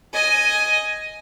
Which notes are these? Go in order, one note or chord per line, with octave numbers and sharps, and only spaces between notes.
D#5 G#5